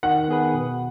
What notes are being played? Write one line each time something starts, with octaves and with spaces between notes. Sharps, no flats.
D#3 F#5
B3 G#4 B4
B2